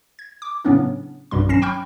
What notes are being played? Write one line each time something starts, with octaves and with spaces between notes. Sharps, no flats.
G#6
D6
A2 C#3 F#3 B3 C#4 D4
B1 G2 B2 G3 C6
G#1 F#3 C#4 A#6 C7 E7
G5 B5 C#6 F6 G6